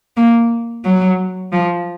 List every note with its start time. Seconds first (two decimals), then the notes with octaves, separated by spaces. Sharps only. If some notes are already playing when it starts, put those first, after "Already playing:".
0.17 A#3
0.85 F#3
1.52 F3